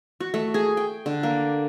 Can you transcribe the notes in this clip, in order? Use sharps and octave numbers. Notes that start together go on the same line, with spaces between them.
F#4
A3
G#4
G5
D3
A#3